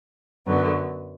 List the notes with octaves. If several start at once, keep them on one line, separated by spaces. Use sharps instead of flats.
F#2 D3 F#3 B3